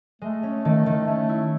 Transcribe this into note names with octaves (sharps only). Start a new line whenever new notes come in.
G#3 A3
C#4
D#3 A3
D#3
A3 C#4
E4